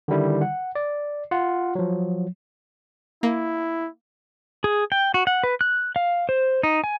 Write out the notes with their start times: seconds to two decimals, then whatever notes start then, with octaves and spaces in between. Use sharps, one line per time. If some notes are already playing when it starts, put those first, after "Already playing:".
0.08 D3 D#3 G3 E4
0.42 F#5
0.75 D5
1.31 F4 F#5
1.75 F3 F#3
3.23 A#3 E4
4.64 G#4
4.92 G5
5.14 F#4
5.27 F#5
5.44 B4
5.61 F#6
5.96 F5
6.29 C5
6.63 D#4
6.84 G#5